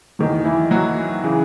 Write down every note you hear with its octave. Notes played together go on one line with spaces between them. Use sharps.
E2 D#3 F#3
E3 E4
F#3 F#4
C#3 E3